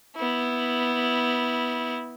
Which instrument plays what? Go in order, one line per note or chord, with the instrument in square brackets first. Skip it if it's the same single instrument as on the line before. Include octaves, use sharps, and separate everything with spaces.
[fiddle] B3 E4